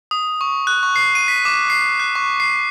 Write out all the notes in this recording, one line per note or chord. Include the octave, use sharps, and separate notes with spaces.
D#6
C#6
F#6
C#6
C7
D#7
B6
D6
C7
F#6
C#6
C7